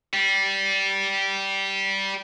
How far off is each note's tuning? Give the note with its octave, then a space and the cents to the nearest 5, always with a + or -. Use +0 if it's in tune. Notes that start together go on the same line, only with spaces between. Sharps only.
G3 -10